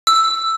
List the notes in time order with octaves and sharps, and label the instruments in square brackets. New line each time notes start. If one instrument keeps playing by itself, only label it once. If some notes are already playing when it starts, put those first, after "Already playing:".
[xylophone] E6